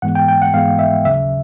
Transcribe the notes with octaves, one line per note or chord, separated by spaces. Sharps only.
G#2 E3 G#3 B3 F#5
G5
G5
F#5
G#2 E3 G#3 B3 F5
E5
D#2 C#3 F#3 E5